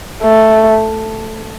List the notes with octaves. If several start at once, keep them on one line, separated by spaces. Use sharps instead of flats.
A3